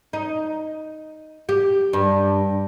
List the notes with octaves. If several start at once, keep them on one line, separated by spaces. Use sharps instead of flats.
D#4
G4
G2